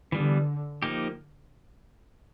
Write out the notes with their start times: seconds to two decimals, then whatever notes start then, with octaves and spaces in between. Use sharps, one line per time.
0.12 D3 E3 G3 B3
0.83 F3 A#3 D#4 G4